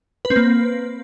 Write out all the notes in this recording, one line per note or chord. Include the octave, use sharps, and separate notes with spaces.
B4
C4
A#3